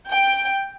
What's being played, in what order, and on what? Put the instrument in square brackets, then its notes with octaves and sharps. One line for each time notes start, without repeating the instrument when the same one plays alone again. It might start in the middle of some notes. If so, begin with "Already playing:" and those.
[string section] G5